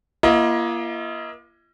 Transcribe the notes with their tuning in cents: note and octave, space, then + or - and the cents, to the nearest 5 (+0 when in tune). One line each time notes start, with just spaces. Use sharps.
A#3 +30 F4 -45 D#5 +25